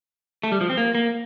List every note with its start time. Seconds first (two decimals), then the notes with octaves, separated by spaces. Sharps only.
0.44 A3
0.52 G3
0.61 F3
0.70 C4
0.77 A#3
0.95 A#3